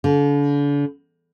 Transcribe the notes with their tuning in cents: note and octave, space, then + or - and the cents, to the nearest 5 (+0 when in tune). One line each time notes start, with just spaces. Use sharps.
D3 -40